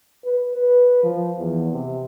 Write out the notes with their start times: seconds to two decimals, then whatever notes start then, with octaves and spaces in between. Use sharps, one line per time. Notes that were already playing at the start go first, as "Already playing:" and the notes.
0.24 B4
0.54 B4
1.03 F3
1.38 E2
1.72 C3